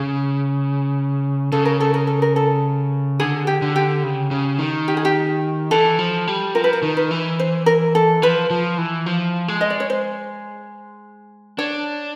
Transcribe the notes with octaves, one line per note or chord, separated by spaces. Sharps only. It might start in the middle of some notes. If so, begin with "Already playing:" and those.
Already playing: C#3 G#4
C#3 A4
A#4
A4
A#4
A4
A#4
A4
D3 G#4
G4
D3
G4
C#3
C#3
D#3
G4
G#4
G4
E3 A4
F3
G3
F3 A#4
B4
A#4
D#3
B4
E3
C5
A#4
A4
F3 B4
F3
E3
F3
G#3
D#5
D5
C#5
C5
D4 C#5